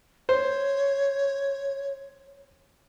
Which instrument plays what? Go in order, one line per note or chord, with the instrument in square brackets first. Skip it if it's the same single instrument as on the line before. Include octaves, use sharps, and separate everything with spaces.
[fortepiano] C5 [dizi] C#5